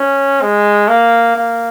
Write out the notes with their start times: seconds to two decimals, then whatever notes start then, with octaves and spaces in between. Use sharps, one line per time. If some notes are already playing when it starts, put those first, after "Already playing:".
Already playing: C#4
0.42 G#3
0.88 A#3
1.36 A#3